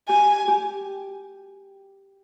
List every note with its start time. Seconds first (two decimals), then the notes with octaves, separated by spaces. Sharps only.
0.08 G4 G#5
0.48 G4